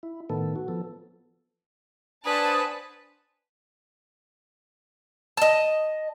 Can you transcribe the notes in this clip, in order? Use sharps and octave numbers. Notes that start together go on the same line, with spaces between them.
E4
A2 D#3 B3 A4
F#4
F3 B3 A4
D4 B4 C5 F#5 G#5 A5 B5 D#6
D#5 A5